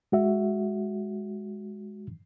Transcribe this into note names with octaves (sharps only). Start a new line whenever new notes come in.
G#3 F#4 E5